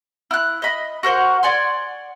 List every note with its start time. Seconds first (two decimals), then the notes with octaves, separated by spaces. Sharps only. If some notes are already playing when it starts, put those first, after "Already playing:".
0.31 E4 F#6
0.62 D#5 B5
1.03 F#4 A#4 C5 F#5
1.43 D5 F#5 G#5 C6